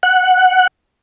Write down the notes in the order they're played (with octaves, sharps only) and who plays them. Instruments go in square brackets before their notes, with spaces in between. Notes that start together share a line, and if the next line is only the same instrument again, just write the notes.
[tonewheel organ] F#5